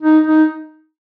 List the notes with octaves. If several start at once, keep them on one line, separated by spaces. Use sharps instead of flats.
D#4
D#4